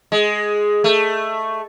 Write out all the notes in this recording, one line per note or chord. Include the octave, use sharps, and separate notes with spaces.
G#3
A3